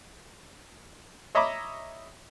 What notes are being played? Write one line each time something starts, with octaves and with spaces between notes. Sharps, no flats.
C#5 D#5 E5 A#5 B5 D6